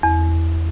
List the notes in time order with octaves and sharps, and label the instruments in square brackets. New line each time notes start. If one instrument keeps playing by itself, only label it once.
[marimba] E2